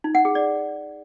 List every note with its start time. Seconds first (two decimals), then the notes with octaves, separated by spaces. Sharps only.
0.04 D#4
0.15 F#5
0.25 G#4
0.35 D5